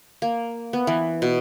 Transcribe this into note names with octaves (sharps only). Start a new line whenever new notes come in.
A#3
B3
E3
B2